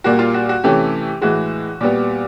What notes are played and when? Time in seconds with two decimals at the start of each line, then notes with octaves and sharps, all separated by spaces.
0.04 A#2 G3 A#3 F#4
0.19 F4
0.34 F#4
0.49 F#4
0.64 C3 E3 A3 C#4 G4
1.21 A2 E3 G#3 F#4
1.81 A#2 G3 B3